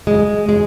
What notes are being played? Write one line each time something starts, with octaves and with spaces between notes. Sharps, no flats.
G#3
G#3